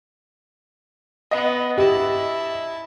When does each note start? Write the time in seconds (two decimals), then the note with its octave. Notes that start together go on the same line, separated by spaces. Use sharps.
1.31 B3 D#5
1.78 E4 G4 A5